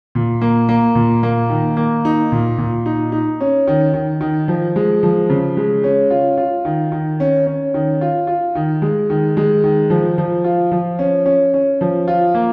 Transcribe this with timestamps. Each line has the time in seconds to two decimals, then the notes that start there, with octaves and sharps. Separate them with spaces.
0.15 A#2
0.41 A#3
0.69 A#3
0.95 A#2
1.23 A#3
1.49 D#3
1.77 A#3
2.05 D#4
2.32 A#2
2.58 A#2
2.86 D#4
3.12 D#4
3.40 C#4
3.67 D#3
3.94 D#3
4.21 D#3
4.48 F3
4.76 G#3
5.03 F3
5.30 C#3
5.57 G#3
5.83 C#4
6.10 F4
6.37 F4
6.65 D#3
6.92 D#3
7.20 C#4
7.47 C#4
7.74 D#3
8.01 F4
8.27 F4
8.55 D#3
8.82 G#3
9.10 D#3
9.37 G#3
9.64 D#3
9.90 F3
10.18 F3
10.44 F4
10.72 F3
10.99 C#4
11.26 C#4
11.54 C#4
11.81 F3
12.08 F4
12.34 A#3